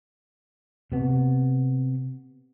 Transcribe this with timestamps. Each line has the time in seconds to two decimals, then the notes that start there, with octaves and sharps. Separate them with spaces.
0.92 C3 B3